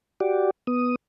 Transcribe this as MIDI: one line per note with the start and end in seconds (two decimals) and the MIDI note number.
0.20 0.51 66
0.20 0.51 67
0.20 0.51 74
0.67 0.95 59
0.67 0.95 87